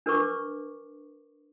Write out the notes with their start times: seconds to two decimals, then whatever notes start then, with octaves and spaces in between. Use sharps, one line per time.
0.06 D4 A#4 B4 C#6 D6